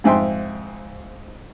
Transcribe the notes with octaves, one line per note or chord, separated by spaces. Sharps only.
F2 G#2 E5 G5 C6